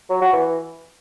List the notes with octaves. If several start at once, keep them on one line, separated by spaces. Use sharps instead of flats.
F#3
F#4
E3